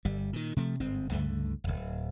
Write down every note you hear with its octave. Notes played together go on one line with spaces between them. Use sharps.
G1 G3
A#2 D#3
C3 F3 A3
G1 G#2 C4
C#2 G2 D3 A3
D1 G1